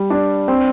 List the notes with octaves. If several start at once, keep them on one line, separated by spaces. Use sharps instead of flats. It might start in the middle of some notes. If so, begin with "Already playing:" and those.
Already playing: G3
D4
C4